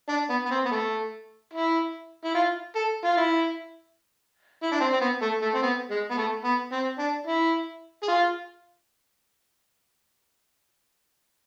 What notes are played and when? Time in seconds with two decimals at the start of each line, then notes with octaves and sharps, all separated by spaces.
0.09 D4
0.29 B3
0.46 B3
0.51 C4
0.65 B3
0.71 A3
1.53 E4
2.25 E4
2.35 F4
2.76 A4
3.05 F4
3.17 E4
4.63 E4
4.72 D4
4.81 C4
4.93 C4
5.01 B3
5.22 A3
5.42 A3
5.55 C4
5.63 B3
5.91 G#3
6.10 B3
6.17 A3
6.44 B3
6.72 C4
6.99 D4
7.27 E4
8.03 G#4
8.09 F4